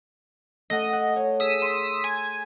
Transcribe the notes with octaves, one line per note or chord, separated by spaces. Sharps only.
A3 D#5 F#5
F#5
C#5
G#4 D#6 E6 B6
C6
G#5